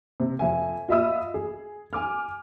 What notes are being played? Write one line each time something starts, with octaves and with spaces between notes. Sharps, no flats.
C3
F2 E5 G#5
F4 D#5 E5 B5 D#6 E6
G#4
G#5 D6 F6